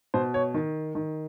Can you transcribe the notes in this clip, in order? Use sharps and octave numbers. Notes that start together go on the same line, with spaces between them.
B2 C5
C#5
D#3
D#3